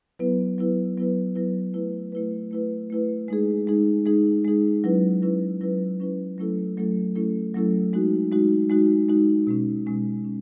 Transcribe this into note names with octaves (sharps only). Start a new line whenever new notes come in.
F#3 B3 E4 B4
F#3 B3 E4 B4
F#3 B3 E4 B4
F#3 B3 E4 B4
A3 E4 B4
A3 E4 B4
A3 E4 B4
A3 E4 B4
G#3 D#4 G#4
G#3 D#4 G#4
G#3 D#4 G#4
G#3 D#4 G#4
F#3 C#4 E4 B4
F#3 C#4 E4 B4
F#3 C#4 E4 B4
F#3 C#4 E4 B4
F#3 A3 C#4 E4 A4
F#3 A3 C#4 E4 A4
F#3 A3 C#4 E4 A4
F#3 A3 C#4 E4 A4
G#3 D#4 F#4
G#3 D#4 F#4
G#3 D#4 F#4
G#3 D#4 F#4
B2 G#3 C#4
B2 G#3 C#4
C#4